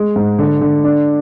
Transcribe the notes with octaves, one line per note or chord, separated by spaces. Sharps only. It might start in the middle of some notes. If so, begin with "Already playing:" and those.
Already playing: G#3
G#2
D3
D3
D4